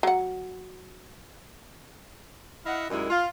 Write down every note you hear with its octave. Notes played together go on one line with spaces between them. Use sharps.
F#3 F#5
E4 D#5 F5 F#5
F#2 D#3 G3 G#3 E4
F4